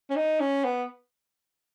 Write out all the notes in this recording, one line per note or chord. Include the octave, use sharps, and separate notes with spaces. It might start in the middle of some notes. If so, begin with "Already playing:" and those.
C#4
D#4
C#4
B3